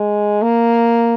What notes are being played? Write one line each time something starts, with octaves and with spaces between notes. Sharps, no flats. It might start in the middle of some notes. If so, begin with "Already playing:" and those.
Already playing: G#3
A#3